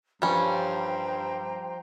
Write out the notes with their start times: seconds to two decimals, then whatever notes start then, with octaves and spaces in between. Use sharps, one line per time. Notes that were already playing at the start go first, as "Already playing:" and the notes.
0.22 G2 F3 G3 C#4 C5 G5 A#5